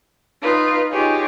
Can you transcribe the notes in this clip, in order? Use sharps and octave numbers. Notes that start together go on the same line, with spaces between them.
D#4 F4 B4
D#4 F4 G4 G#4 C#5